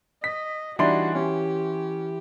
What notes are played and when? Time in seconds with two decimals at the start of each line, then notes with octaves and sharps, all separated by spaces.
0.24 D#5 B6
0.79 E3 G3 D4 D#4 F#4 C6
1.15 C#4 G4